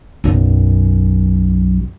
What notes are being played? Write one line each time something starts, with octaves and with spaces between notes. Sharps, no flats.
B1 F#2